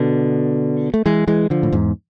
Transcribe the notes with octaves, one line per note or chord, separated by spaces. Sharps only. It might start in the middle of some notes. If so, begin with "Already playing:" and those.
Already playing: B2 D3
A3
E3 G#3
E3 G#3
D3 F3
A2
E2 G#2